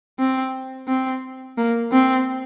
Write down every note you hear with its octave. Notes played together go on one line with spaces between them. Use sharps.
C4
C4
A#3
C4